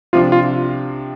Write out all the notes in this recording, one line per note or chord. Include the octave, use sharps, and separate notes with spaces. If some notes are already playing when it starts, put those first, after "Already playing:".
C3 F3 D4 F4
F4